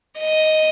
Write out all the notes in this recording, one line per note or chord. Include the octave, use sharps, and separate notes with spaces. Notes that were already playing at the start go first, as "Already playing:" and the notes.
D#5